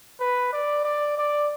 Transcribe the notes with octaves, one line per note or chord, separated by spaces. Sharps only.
B4
D5
D5
D5